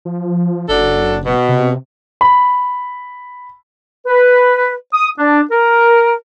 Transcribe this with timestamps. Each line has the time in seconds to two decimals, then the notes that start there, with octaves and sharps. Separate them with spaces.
0.05 F3
0.69 F#1 F#3 D4 A4
1.26 B2
1.49 C3
2.21 B5
4.06 B4
4.93 D#6
5.19 D4
5.51 A#4